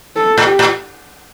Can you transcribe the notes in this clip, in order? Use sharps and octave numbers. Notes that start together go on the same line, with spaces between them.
A4
A2
G4
A2